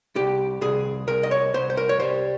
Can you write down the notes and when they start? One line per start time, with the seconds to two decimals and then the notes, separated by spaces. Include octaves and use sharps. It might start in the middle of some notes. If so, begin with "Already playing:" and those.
0.16 C2 G4
0.61 C2 G#4
1.08 C2 A#4
1.23 D#5
1.31 C#5
1.54 C2 C5
1.70 C5
1.77 A#4
1.89 C#5
2.00 G3 C5